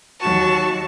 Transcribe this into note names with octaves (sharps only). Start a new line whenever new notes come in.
D#2 F#3 F#4 A5 C#6